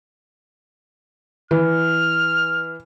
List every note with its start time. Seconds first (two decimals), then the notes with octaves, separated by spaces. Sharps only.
1.51 E3 F6